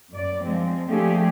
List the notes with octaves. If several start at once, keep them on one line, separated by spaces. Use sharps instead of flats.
F#2 D5
F3 G#3 C4
F3 A3 D4 G4 G#4